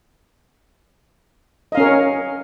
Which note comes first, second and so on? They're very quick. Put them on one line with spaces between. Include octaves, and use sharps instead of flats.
D#5 F5 C#4 A#4 C#5